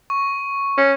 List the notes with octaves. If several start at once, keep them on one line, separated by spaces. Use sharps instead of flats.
C#6
C#4